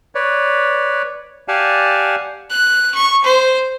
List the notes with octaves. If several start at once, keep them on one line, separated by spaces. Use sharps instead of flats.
B4 C#5 D5
G4 D5 F5 F#5 G#5 A5
F#6
C#6
C5